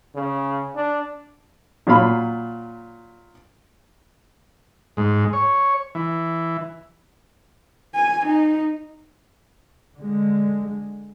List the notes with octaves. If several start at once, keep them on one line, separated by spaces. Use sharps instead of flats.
C#3
D4
A#2 F#3 F4 F5 B5
G#2
C#5
E3
G#5
D#4
D3 G#3